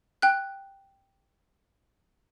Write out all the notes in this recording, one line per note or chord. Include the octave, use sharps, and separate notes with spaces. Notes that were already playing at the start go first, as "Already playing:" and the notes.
G5 F#6